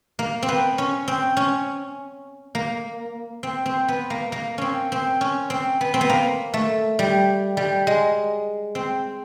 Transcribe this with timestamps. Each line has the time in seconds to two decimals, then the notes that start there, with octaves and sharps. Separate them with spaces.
0.19 A#3
0.43 C4
0.49 B3
0.78 C#4
1.08 C4
1.37 C#4
2.55 A#3
3.43 C4
3.66 C4
3.88 B3
4.10 A#3
4.32 A#3
4.58 C4 C#4
4.92 C4
5.21 C#4
5.50 C4
5.81 B3
5.94 C4
6.01 B3
6.10 A#3
6.54 A3
6.99 G3
7.57 G3
7.87 G#3
8.75 C4